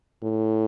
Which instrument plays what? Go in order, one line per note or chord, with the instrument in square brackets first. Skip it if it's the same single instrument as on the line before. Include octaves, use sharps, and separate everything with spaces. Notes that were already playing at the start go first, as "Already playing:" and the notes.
[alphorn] A2